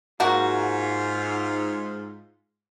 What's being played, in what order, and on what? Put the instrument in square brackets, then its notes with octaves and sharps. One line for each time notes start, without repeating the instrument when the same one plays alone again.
[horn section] G#2 F4 [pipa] A#3 F#4